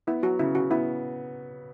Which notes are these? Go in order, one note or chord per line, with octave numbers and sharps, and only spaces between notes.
B3 E4
F#3 F#4
C#3 E4
C#3 F#4
B3 E4